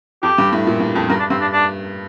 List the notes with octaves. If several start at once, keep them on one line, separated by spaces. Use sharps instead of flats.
F2 G4
G2
A2
A#2
G2
F2
G2 A#4
D4
G2 C4
D4
D4